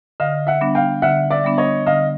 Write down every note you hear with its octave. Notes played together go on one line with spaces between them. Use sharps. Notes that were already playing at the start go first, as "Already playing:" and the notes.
D3 D#5 F5
E5 F#5
G3 B3 D4
F5 G5
D3 E5 F#5
D5 E5
G3 B3 D4
C#5 D#5
D3 D#5 F5